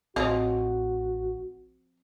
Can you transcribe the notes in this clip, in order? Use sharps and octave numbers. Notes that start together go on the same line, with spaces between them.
A1 F3 C4 F#4 C#5 D#5 F5